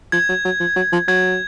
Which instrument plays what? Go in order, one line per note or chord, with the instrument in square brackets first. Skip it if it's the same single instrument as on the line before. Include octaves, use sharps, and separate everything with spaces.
[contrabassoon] F3 [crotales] G#6
[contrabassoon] F#3
F#3
F3
F#3
F3
[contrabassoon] F#3 [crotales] G#6